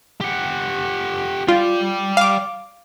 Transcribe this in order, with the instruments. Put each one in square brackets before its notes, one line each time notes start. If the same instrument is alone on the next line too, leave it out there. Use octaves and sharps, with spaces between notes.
[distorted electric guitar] G4 F#5
[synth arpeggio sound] F4 [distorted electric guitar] D5 G5
[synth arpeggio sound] F5 D6